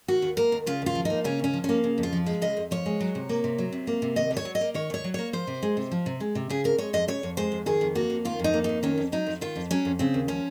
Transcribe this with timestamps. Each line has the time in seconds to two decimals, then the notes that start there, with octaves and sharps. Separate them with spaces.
0.08 D#3 F#4
0.22 D#2
0.37 A#3 A#4
0.52 D#2
0.66 C#3 F4
0.82 D#2 F4
0.95 F3
1.05 A#3 D#4
1.24 C#3 C#4
1.39 D#2 C#4
1.54 F3
1.64 A#3 C#4
1.84 C#3
1.98 F2
2.03 F4
2.13 F3
2.26 G#3
2.42 C#3 D#5
2.57 F2
2.71 F3 C#5
2.86 G#3
3.00 F#3
3.15 C3
3.29 A#3
3.44 C3
3.58 F#3
3.72 C3
3.87 A#3
4.02 C3
4.16 D#3 D#5
4.31 D#2
4.37 C#5
4.45 F#3
4.55 D#5
4.61 A#3
4.74 D#3 C#5
4.90 D#2 C#5
5.04 F#3
5.14 A#3 C#5
5.33 F3 C5
5.47 C3
5.63 G#3
5.77 C3
5.91 F3
6.06 C3
6.20 G#3
6.35 C3
6.50 C#3 G#4
6.64 F2 A#4
6.78 G#3 C#5
6.93 F2 D#5
7.08 C#3 C#5
7.23 F2
7.37 G#3 C5
7.52 F2
7.66 D#3 G#4
7.81 F2
7.95 A#3 F#4
8.10 F2
8.25 D#3 F4
8.39 F2 D#4
8.54 A#3
8.64 F2 D#4
8.83 D#3 C#4
8.98 F2
9.12 F#3 D#4
9.27 F2
9.41 D#3 F4
9.56 F2
9.71 F#3 C#4
9.85 F2
9.99 C#3 C4
10.14 D#2
10.28 F3 C#4